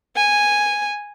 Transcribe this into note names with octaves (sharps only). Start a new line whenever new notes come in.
G#5